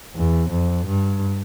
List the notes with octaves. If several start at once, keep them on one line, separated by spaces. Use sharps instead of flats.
E2
F2
G2